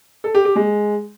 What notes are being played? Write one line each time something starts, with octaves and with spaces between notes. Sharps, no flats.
A4
G4
G4
G#3